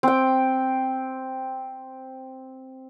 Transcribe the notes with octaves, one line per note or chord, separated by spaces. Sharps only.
C4 G5